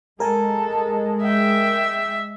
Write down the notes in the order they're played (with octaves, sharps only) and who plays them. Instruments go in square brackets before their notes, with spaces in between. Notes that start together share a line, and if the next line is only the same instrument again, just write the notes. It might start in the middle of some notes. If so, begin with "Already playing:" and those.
[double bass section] G#3 [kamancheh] A4 [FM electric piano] A#4 G#5
[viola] E5 [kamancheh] G5